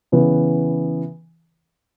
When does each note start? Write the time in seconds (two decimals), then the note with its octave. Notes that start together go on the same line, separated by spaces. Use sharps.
0.12 C#3 E3 B3